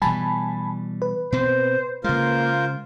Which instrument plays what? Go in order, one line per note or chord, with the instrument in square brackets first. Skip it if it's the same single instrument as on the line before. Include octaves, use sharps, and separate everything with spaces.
[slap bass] B2 E3 G3 [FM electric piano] G#5 A5 B5
[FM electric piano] B4
[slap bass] B2 C4 [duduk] C5
[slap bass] C#3 G#3 [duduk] A#3 [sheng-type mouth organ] F4 A#4 C5